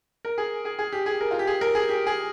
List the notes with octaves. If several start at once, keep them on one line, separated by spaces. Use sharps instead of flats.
A#4
G#4
G#4
G#4
G4
G#4
A#4
F4
G4
G#4
A#4
G#4
G4
G#4